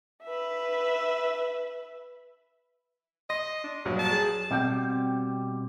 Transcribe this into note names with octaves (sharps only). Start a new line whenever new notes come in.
B4 E5
D#5 C6 A#6
D4
A#1 G2 F#3
A5
G#4
B2 G3 C4 G5